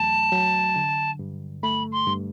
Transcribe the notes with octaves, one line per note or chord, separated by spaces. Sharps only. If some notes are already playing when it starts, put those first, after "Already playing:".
Already playing: E2 F#3 A3 A5
F#3
D3
G2
A3 B5
C6
G2